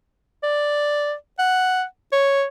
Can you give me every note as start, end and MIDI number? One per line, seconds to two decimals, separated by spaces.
0.43 1.14 74
1.39 1.83 78
2.12 2.45 73